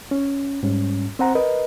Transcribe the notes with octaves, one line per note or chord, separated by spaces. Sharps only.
C#4
G#2 G3 C#4
C4 C5 F#5 A#5
A#4 B4 D#5